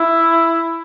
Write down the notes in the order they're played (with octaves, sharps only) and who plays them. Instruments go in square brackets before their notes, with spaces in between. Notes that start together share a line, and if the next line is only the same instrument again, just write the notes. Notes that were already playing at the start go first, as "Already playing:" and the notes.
Already playing: [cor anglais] E4